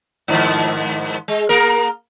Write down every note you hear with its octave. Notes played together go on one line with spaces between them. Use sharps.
G#2 D#3 F3
G#3
A#3 A#4